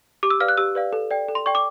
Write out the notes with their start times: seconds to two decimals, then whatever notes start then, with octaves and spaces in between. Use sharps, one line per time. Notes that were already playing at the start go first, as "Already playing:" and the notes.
0.23 G4 D6
0.30 E6
0.40 B4 D5 F5 F6
0.48 F#6
0.57 G4 E6
0.75 B4 D5 F5
0.93 A4
1.11 D5 G5
1.28 A4
1.35 C6
1.46 D5 G5 C#6
1.55 D6